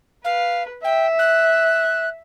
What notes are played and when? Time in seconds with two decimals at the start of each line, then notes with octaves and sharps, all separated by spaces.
0.24 B4 F5
0.84 E5 G5
1.19 F#6